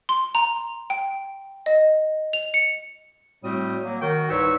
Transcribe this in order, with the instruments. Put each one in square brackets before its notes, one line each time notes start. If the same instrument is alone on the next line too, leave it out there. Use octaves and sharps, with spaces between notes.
[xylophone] C6
A#5
G5
D#5
F7
C#7
[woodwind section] A2 G3 A3 C4 F#4 D#6
F#3 A#3
D#3 F#4 A#4 G5
C2 G#2 B4 C#5 C#6 E6